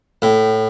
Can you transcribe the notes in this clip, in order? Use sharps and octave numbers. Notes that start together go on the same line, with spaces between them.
A2